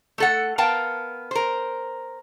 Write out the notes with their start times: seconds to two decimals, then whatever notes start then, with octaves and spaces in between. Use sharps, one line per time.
0.18 A3 A4 F#5
0.58 B3 A#4 F5 G5 A5
1.31 A#4 C5